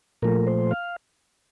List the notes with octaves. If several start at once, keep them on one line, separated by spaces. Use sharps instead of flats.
A#2 F3 A3 A#4
C5
F5